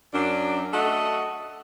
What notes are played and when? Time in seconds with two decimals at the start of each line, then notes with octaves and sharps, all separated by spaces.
0.14 F#2 D4
0.73 A3 F#4 A4 D#5 F#5